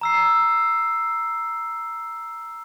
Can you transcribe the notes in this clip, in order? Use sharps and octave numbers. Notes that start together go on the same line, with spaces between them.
A#5 E6 C7